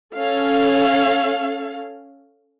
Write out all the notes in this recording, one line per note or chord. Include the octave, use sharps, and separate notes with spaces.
C#4 A4 F5